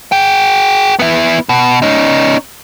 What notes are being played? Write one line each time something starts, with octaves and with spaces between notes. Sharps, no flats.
G#4 G5
B3 E4
B2
C#4 D#4